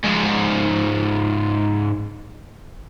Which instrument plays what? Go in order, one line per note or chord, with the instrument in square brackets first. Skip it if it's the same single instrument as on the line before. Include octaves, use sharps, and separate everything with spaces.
[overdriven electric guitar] G#2 F3